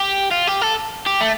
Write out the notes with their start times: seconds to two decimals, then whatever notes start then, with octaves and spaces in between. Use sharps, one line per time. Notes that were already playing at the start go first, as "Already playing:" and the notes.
Already playing: G4
0.31 F4
0.47 G4
0.61 A4
1.07 G4
1.21 A3